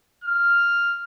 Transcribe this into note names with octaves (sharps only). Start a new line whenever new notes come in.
F6